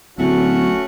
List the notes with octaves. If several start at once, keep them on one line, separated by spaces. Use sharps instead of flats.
D1 A3 C#4 F#4